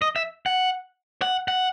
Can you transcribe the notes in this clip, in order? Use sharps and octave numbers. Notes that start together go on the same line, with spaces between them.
D#5
E5
F#5
F#5
F#5